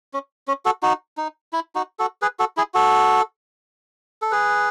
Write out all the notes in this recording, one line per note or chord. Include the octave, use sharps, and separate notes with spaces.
C#4
C#4
F#4 A4
D#4 F#4
D#4
E4
D#4 F#4
F#4 A4
G#4 B4
F#4 A4
E4 G#4
F#4 A4
A4
G#4 B4